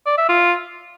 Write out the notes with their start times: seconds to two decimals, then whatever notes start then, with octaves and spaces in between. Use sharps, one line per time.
0.06 D5
0.17 E5
0.29 F4